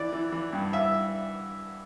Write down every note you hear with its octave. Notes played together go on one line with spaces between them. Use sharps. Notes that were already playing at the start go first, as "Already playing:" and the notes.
Already playing: E3 D5
E3
E3
G2
E5